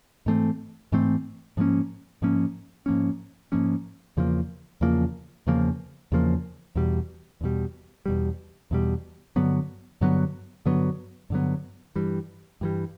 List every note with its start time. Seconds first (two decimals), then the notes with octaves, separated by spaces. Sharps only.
0.26 G#2 E3 A3 C4
0.92 G#2 E3 A3 C4
1.57 G#2 F3 A#3 C#4
2.22 G#2 F3 A#3 C#4
2.86 G#2 F3 A#3 C#4
3.52 G#2 F3 A#3 C#4
4.17 E2 C#3 F3 A#3
4.81 E2 C#3 F3 A#3
5.47 E2 C#3 F3 A#3
6.12 E2 C#3 F3 A#3
6.76 E2 B2 G3
7.41 E2 B2 G3
8.06 E2 B2 G3
8.71 E2 B2 G3
9.36 G2 D3 F#3 B3
10.01 G2 D3 F#3 B3
10.66 G2 D3 F#3 B3
11.30 G2 D3 F#3 B3
11.96 G2 E3 G3
12.61 G2 E3 G3